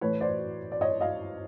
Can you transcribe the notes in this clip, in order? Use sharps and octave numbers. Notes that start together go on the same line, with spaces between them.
A2 E3 A3 B4 C#5
C5 D5
D5
C#5 D#5
D#5 F5